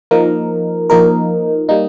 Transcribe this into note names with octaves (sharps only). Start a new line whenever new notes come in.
F3 A#3 D#4 A#4
F3 A#3 D#4 A#4
G3 A#3 D#4